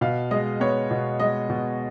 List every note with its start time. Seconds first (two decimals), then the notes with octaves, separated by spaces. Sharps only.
0.01 B2 F5
0.31 G#3 D#5
0.60 B3 C#5
0.91 B2
1.19 G#3 D#5
1.50 B2